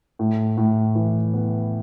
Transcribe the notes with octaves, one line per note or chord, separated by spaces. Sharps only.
A2
A2
E3
B3